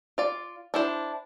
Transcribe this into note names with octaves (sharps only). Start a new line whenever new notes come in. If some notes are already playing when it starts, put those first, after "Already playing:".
F4 D5
D4 E4 C5